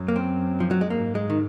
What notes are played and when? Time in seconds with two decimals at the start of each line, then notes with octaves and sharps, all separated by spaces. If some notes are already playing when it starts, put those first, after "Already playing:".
Already playing: F#2
0.08 A#3
0.16 C4
0.60 F3
0.71 F#3
0.81 G#3
0.90 G#2 A#3
1.15 G#3
1.30 D#3